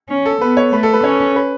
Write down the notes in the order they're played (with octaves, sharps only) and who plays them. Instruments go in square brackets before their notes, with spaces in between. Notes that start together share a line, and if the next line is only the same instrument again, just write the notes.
[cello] C#4
[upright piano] A4
[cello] B3 [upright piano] B4
[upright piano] C#5
[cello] A3 [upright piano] B4
[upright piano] A4
B4
[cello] C#4 [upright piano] C#5
[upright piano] B4